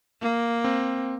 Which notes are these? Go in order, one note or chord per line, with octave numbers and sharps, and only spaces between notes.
A#3
C4